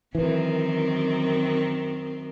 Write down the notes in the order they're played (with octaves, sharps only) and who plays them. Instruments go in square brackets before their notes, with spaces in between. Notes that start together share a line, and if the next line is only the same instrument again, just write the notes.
[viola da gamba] F#2 D#3 C4 [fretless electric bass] E3